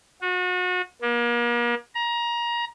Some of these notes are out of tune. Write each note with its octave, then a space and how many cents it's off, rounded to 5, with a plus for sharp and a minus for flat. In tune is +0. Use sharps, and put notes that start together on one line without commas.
F#4 -35
A#3 +40
A#5 +25